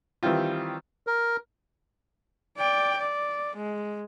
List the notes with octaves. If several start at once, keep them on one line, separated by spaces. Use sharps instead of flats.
D#3 E3 G3 C4 F4
A#4
D5 G5
D5
G#3